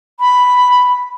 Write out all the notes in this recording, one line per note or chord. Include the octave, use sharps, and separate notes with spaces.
B5